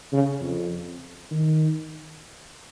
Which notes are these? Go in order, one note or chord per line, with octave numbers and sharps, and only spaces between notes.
C#3
F2
D#3